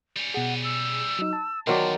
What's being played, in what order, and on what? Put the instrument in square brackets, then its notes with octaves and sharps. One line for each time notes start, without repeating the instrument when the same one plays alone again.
[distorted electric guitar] G3 C#4
[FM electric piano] B2 G#4 [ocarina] F#5
[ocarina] E6
[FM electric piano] F#3 D#4
A5
[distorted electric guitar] E2 [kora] D#3 F#3 D5 [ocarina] C6